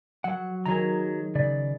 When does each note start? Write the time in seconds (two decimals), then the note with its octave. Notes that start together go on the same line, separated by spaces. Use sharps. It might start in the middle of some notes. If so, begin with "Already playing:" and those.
0.24 F#3 F#5
0.66 D#3 F#3 G#4 A#5
1.35 C#3 D5